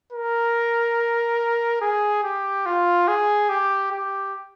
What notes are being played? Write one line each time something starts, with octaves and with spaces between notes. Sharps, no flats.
A#4
G#4
G4
F4
G#4
G4
G4